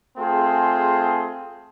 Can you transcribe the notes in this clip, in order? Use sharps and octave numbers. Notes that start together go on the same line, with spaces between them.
A3 C4 F4 G#4